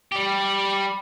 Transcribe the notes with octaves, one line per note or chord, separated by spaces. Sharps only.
G3 G4